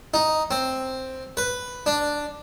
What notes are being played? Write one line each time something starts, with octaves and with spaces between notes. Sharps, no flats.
D#4
C4
B4
D4